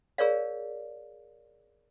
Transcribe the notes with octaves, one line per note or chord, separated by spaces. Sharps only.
G#4 A#4 C#5 D5 F5